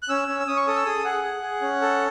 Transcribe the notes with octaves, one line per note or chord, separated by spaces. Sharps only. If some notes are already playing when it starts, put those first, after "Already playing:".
F#6
C#4 E6
C#4
E6
C#4 D#6
C#6
A4 D#6
E6
G#4 D#6
G#4 F#5
G#4
G#4
C#4
A4